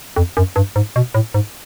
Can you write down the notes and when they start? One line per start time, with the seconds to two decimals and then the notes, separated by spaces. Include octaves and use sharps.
0.16 F2
0.37 F#2
0.56 G2
0.76 G#2
0.96 B2
1.14 A2
1.34 G#2